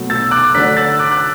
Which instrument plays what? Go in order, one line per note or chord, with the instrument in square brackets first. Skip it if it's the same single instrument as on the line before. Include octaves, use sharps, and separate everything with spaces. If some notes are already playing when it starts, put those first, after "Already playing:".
Already playing: [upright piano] B2 F#3 A3
E6 A6
D6 F#6
D3 F#3 A3 D4 F#6 B6
E6 A6
D6 F#6
F#6